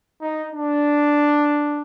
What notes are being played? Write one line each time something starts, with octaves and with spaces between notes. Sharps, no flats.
D#4
D4